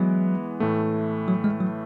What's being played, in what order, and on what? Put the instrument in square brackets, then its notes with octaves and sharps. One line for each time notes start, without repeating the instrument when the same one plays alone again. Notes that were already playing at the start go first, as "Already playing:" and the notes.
Already playing: [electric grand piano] E3 G#3 B3 [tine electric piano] F#3
[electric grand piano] A2 E3 A3
[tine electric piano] F#3
G#3
F#3